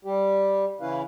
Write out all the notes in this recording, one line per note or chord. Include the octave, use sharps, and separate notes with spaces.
G3 G4
C#3 E3 C#4 E4 B4 F5